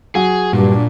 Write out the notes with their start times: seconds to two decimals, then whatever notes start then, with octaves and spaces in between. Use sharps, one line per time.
0.15 F#3 G#4
0.53 G2 A#2 D4